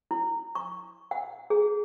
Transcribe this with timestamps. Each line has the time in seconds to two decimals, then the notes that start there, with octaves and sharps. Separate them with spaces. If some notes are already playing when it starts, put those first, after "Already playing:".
0.11 E4
0.55 C#6
1.11 F#5
1.50 G#4